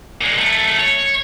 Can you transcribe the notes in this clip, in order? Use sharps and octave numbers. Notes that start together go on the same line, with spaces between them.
A#2 G#3
F#2 A3
C#5